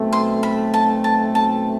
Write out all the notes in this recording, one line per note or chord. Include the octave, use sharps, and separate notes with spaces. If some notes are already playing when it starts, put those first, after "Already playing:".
Already playing: B1 B2 A3 C4
C6
B5
A5
A5
A5